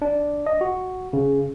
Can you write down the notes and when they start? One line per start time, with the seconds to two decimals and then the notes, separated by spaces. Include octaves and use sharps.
0.02 D4
0.46 D#5
0.61 F#4
1.13 C#3